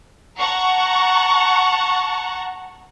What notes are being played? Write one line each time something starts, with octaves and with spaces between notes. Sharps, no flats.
F#5 A5 A#5 C#6